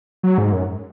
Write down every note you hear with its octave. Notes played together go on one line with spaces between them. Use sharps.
F#3
G#2
F#2